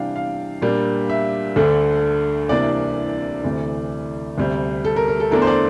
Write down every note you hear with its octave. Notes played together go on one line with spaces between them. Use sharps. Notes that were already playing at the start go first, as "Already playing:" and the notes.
Already playing: C3 E3 G3 D4 F5 G5
F5
A#2 G3 A#3 D4
E5
D2 D3 A3 D4
C2 C3 E3 A#3 D4 D5
D2 C3 E3 A3
D2 C3 G3
A4
A#4
A#4
A4
E2 D3 A3 D4 A#4
C5
D5